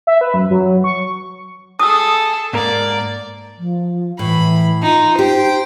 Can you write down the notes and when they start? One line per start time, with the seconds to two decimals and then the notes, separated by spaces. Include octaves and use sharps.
0.07 E5
0.21 B4
0.34 F#2
0.51 F#3
0.84 C#6
1.80 G#4 A4 D#6 E6
2.53 G#2 A#3 A#4 D5
3.58 F3
4.19 A2 E3 B5
4.82 D#4 F4
5.19 D#4 G4 C5 G5